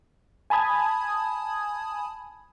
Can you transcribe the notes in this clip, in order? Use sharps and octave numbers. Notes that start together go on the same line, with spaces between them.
G#5 A5 B5 D#6 G#6